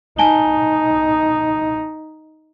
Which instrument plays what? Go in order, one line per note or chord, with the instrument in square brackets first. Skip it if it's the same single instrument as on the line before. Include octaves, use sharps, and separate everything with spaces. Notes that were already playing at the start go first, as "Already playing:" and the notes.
[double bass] D#4 [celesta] G#5 A5 G7